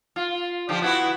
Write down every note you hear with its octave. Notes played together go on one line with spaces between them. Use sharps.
F4
D3 F3 G4
B3 E4 F#4